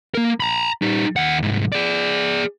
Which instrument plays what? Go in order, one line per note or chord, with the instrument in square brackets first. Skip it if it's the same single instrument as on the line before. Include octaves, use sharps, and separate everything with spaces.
[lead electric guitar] A#3 A#4
A#5 B5
G3 D#4
D#2 F#5
C2 G#2
G#4 D5